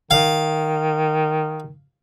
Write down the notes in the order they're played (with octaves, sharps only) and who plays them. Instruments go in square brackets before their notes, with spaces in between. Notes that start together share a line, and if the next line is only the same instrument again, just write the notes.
[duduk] D#3 [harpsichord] F5